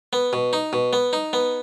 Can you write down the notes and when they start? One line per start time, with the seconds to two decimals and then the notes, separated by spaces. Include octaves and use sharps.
0.13 B3
0.33 B2
0.53 D#4
0.73 B2
0.93 B3
1.13 D#4
1.33 B3